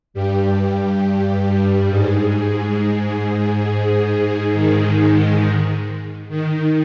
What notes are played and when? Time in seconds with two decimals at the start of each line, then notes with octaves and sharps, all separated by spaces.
0.14 G2 G3
1.89 G#2 G#3
3.65 G#2 G#3
4.54 D#3
6.29 D#3